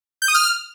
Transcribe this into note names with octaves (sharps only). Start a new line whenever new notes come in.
G6
D#6
F6